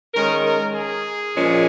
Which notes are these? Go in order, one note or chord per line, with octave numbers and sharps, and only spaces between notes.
D#3 G#3 C#4 A#4
A#4
G#4
A#2 F3 G#3 C#4